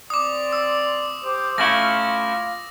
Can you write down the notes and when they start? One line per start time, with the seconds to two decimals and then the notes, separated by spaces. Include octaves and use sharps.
0.10 C4 D5 C6 D6 D#6
0.53 E6
1.23 G4 C5 D6
1.58 A3 C#4 E4 F4 F5 A#6